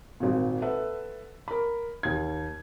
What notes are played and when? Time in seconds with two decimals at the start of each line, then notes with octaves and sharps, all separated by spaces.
0.20 G#1 A#2
0.62 A4 B4 E5 F#5
1.48 A#4 B5
2.03 D#2 G#6